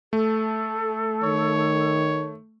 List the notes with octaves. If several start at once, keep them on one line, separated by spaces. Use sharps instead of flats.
A3 A4
D#3 C#5